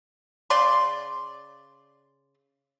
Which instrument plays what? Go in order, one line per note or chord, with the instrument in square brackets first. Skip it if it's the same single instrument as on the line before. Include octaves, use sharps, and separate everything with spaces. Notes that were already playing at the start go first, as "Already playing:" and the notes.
[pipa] C#3 D5 C6